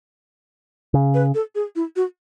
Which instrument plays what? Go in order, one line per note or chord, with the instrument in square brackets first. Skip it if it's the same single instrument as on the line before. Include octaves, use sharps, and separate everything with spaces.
[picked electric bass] C#3
[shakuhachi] B4
A4
G#4
E4
F#4